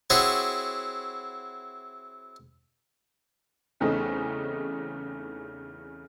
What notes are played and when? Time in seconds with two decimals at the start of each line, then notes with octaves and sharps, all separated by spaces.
0.10 C4 E4 F#4 G#4 C#5
3.80 E2 C#3 A3 C4 C#4 D#4